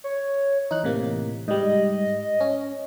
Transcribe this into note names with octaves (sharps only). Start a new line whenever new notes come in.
C#5
E3 D#4 F#6
A2 C3 A#3
G#2 G3 D#5
C#4